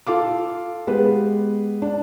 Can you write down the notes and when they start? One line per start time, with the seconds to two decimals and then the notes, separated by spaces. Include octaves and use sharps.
0.07 F4 A4 F5 D6
0.87 G#3 B3 G4 B4
1.82 D4